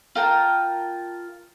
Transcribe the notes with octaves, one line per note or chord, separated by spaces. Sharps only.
F4 A#4 G5 A5